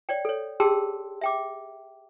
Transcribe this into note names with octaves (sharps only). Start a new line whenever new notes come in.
C#5 D5 G5
A4 C#5
G4 G#4 G5 A5 C6 E6
E5 G5 D6